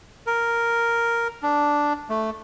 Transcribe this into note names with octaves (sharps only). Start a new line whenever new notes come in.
A#4
D4
A3